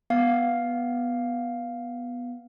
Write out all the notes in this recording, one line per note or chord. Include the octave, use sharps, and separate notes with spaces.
B3 F5